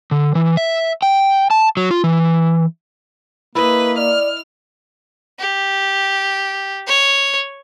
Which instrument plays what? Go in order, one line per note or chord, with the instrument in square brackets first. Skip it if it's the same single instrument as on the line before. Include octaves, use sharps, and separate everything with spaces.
[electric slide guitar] D3
E3
E5
G5
A5
F#3
F4
E3
[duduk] A#3 [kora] E4 D#5 [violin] B4
[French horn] D5 [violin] F6
[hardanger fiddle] G4
C#5